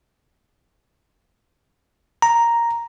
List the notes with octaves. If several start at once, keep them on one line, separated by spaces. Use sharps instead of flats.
A#5